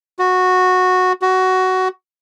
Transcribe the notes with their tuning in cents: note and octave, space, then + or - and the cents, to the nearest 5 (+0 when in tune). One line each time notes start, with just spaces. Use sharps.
F#4 -10
F#4 +15